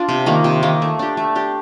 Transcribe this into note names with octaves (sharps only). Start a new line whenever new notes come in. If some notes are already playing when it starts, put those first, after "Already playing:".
Already playing: D4 F4
C3
D#3 A#3
C3
D#3 A#3
A3
D4 G4
A3
D4 G4